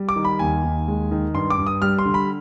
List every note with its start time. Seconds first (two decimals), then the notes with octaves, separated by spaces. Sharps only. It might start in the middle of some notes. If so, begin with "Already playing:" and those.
Already playing: G3
0.09 D6
0.16 D#3
0.25 B5
0.39 D#2 G#5
0.64 D#2
0.88 G#3
1.11 D#3
1.34 G2 C6
1.50 D6
1.58 G2
1.67 D#6
1.82 G3 F6
1.99 C6
2.06 D3
2.14 B5